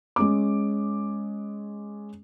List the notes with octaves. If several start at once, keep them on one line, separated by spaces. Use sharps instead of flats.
G#3 C#4 D6